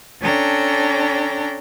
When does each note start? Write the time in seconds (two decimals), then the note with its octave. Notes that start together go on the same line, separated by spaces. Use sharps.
0.21 C#4 D4 A4 G5 A#5